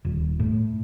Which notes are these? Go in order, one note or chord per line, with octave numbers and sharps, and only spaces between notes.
D#1
A2